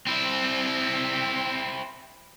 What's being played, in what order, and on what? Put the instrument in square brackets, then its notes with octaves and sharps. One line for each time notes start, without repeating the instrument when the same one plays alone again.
[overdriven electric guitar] C4 E4